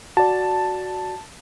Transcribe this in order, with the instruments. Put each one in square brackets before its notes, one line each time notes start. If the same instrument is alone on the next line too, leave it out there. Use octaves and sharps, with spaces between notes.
[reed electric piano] F#4 D5 [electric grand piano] A5